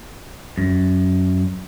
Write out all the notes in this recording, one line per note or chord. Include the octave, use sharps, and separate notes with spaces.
F#2